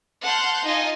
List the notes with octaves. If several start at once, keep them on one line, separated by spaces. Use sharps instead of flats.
F#5 A5 C6 F6 G6
D#4 F4 D#5 G#5